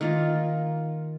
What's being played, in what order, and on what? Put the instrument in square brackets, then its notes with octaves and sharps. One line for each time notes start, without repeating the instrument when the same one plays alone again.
[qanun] D#3 A#3 F4